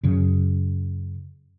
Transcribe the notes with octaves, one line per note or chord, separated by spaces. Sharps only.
F#2 C#3